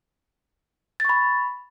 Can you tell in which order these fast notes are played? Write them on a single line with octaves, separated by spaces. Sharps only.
A6 C#6 B5